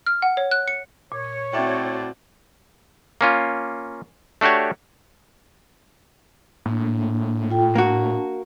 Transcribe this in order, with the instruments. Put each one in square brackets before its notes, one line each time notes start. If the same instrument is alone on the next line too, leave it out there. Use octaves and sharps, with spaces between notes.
[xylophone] F6
F#5
C#5
F#6
C#7
[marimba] A#2 [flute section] C#5
[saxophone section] A2 D5 [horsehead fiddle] C4 F#4 [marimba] E5 G5
[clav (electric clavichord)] A#3 C#4 F4
A3 D4 F#4 G4 C#5
[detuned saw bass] A2 [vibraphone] A#3 D4
[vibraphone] F4 A4 G5
[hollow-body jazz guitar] A#3 F#4 [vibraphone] D4 A5